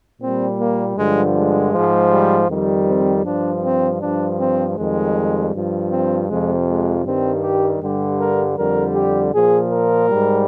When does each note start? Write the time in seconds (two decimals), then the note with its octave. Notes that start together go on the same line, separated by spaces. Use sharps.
0.20 A#2 G3 C4
0.58 A#3
0.96 G2 D3 F3 G#3
1.34 G#3
1.72 G#2 F3
2.11 G3
2.48 F2 D#3 G3
2.87 C4
3.24 G2 F3 D4
3.62 C4
4.00 G2 F3 D4
4.39 C4
4.76 F2 D#3 G3 G#3
5.53 G2 F3
5.91 C4
6.29 F2 C3 F3 G#3
6.67 G#3
7.04 G2 D#3 G3 C4
7.42 G4
7.81 G2 D3 G3 G4
8.19 A#4
8.57 F2 D3 G3 A#4
8.95 G4
9.33 A#2 F3 G#4
9.71 A#4
10.09 G#2 G3